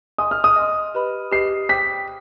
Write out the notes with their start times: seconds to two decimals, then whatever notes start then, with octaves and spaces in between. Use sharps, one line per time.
0.18 D#5 G#5 C6 D#6
0.31 F6
0.44 D#6
0.56 D#5 G#5 C6
0.95 G4 B4 D#5 B5
1.32 G4 B4 D#5 B5 C7
1.69 C5 G5 D6 G6 B6